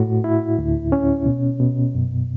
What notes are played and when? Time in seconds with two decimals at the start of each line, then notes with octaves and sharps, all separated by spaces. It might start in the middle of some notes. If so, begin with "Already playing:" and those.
Already playing: A2 F#4
0.24 E4
0.59 D2
0.92 C#4
1.26 B2
1.60 B2
1.94 F#2